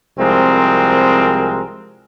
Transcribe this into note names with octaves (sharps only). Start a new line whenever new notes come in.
C2 F3 G#3 C4 A#4